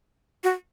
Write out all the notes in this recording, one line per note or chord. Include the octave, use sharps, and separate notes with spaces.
F#4